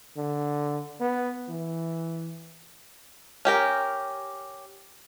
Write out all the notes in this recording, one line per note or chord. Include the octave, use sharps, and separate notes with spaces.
D3
B3
E3
C#4 G4 A#4